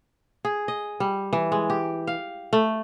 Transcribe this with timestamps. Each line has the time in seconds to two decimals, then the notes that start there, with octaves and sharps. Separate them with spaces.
0.45 G#4
0.68 D#5
1.00 G3
1.33 E3
1.52 G#3
1.70 G4
2.07 F5
2.53 A3